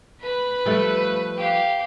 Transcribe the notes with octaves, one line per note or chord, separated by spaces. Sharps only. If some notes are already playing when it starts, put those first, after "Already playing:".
B4 B5
F3 G3 A3
G4 F5